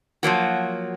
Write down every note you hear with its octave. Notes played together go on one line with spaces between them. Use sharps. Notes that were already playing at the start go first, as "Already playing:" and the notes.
F3 F#3 A#3 F#4